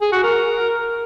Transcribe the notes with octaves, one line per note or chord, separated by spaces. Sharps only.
G#4
F#4
A#4